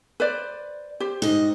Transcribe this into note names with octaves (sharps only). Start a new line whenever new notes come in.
B4 C5 D5
G4 C5
G#2 D#5